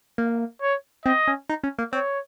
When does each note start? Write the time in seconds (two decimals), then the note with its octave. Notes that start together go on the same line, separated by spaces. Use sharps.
0.18 A#3
0.62 C#5
1.06 C4 D#5
1.28 C#4
1.49 D#4
1.63 C#4
1.78 A#3
1.93 C4 C#5